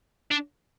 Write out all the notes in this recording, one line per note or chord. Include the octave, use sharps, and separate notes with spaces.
D4